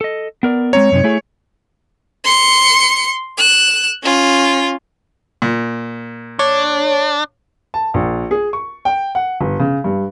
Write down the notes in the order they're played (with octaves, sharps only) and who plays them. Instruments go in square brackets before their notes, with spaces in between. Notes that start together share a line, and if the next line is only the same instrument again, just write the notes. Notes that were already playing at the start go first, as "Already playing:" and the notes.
[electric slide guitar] A4 D#5
B3 A#4 D5
[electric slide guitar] G#3 C4 A#5 [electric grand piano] C#5
[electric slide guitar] F#2 C3 D#4
A3 E4 G#4
[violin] C6 C#7
F#6 E7
C#4 F4
[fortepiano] A#2
[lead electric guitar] D4 [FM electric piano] C#5
[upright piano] A5
A#1
G#4
C#6
G5
F#5
G1
C#3
G2